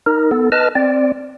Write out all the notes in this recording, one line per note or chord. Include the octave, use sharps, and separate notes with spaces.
D#4 A#4
B3 A4
B4 D#5 A5 F6
C4 D5